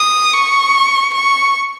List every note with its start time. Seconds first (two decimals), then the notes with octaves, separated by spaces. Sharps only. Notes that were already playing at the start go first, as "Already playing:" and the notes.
Already playing: D#6
0.33 C#6
1.14 C#6